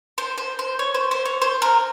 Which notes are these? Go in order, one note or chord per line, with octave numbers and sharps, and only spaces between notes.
C5
C5
C5
C#5
C5
C5
C#5
C5
A#4